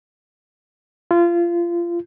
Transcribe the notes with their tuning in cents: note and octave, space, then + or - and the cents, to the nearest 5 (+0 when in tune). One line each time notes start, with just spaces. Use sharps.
F4 -25